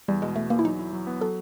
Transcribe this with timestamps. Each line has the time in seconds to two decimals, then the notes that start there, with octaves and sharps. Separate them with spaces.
0.08 E2 G3
0.22 B2 G#3
0.36 B2 A3
0.50 E2 A#3
0.59 E4
0.64 F#3 D#4
0.79 E4
0.93 F#3
1.07 B3
1.21 F#3 A4